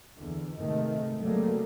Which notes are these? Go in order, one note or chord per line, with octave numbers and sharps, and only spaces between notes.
E2 D3
G#2 C3 D#3 A3
C#3 F#3 G3 A3 A#3 C4